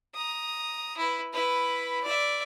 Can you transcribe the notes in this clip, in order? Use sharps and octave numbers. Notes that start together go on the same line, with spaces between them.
A#5 D#6
E4 B4
E4 B4
D5 E5